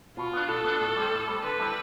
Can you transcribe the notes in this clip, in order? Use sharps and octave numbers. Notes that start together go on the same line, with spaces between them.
B2 F4
B3 D4
B2 A4
B3 D4
A2
G3 C4
A2
G3 C4
D3 B4
G3 C4 E4 A4